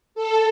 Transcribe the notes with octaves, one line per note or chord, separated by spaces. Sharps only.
A4